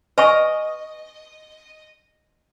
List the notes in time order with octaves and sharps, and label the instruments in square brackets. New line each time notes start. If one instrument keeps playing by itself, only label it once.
[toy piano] B4 G#5 C#6 [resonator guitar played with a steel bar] D#5